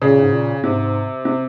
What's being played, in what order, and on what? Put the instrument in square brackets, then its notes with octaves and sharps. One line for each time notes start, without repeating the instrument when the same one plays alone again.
[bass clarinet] A#2 [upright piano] C#3
[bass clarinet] G#2
A#2
[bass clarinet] G#2 [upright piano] C3
[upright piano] C3